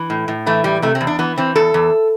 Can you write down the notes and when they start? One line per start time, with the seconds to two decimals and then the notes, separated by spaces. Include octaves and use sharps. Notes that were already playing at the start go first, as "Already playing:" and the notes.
Already playing: E3
0.10 A2
0.28 A2
0.46 E3 A3
0.64 A2 G3
0.82 C3 A3
0.95 C4
1.01 E2
1.07 D4
1.19 E3 B3
1.37 E3 C4
1.55 E2 A4
1.74 E2